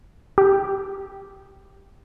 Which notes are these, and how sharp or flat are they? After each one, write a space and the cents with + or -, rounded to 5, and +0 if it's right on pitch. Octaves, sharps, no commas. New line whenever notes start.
G4 -5